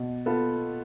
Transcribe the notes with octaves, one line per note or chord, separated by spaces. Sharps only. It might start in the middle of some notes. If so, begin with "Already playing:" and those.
Already playing: B2
B3 F4 A4